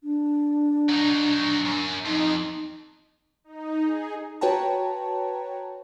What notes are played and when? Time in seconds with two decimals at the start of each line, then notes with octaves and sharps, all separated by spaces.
0.03 D4
0.89 F#3 D#4
1.66 F#2
2.06 F2 D#4
3.44 D#4
3.83 G#4
4.41 F#4 B4 C#5 G5 A5 A#5